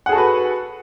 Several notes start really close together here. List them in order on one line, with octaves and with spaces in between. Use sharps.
F#5 G#4 A4 F#4 B4